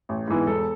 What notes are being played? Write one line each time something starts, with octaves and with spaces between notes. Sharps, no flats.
A1
G#2 E3 B3
E1 A4